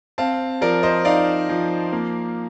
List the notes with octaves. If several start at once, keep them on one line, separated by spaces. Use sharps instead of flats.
C4 F5 A5
F3 A#4 D5
C5 D#5
D#4 D5 F5
F3
A#3